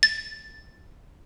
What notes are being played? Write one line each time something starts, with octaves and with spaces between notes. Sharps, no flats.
A6